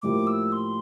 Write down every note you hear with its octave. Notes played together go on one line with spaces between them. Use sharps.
A2 F3 A#3 E4 G4 D6
E6
C6